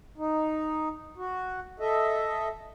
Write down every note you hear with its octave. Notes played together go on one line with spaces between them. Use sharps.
D#4
F#4
A4 D#5 E5